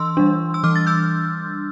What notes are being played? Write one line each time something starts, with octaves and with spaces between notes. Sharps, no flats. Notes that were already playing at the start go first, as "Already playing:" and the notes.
Already playing: E3 C6 E6
G3 D4
E6
E3 D6 F6
A6
E6 G6